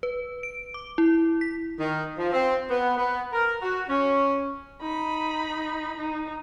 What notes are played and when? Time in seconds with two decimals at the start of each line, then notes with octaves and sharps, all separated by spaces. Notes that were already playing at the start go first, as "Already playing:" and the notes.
0.03 B4
0.43 D7
0.74 D6
0.98 E4
1.41 B6
1.79 D#3
2.18 F3
2.33 C4
2.70 B3
2.98 B3
3.33 A#4
3.62 F#4
3.89 C#4
4.81 D#4 B5
5.97 D#4